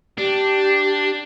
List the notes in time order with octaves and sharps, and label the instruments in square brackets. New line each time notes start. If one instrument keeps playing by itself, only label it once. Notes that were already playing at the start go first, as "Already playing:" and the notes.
[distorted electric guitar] D4 [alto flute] G4